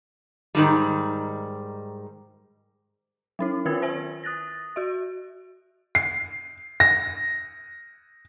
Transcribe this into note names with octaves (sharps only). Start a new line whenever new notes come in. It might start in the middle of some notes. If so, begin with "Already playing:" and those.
G#2 D#3 G3
F#3 C#4 E4
D#3 F4 A#4 B4 E6 G#6
C5 E5 G#5
D#6 F#6 A6 A#6
F#4 E5
C7
A#6